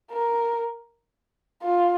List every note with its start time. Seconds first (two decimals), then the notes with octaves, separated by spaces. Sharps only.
0.12 A#4
1.63 F4